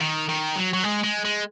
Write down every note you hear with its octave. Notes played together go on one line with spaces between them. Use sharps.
D#3
D#3
F#3
F#3
G#3
G#3
G#3